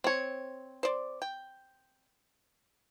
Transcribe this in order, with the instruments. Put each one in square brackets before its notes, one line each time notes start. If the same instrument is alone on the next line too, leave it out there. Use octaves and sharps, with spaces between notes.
[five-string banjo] C4 C#5
[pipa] C5 D5
G5